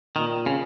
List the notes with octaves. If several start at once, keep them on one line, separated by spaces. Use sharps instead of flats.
A#2 D#3
C#3